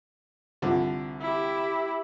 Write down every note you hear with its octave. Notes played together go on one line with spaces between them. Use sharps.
C2 D3 F3
E4 G4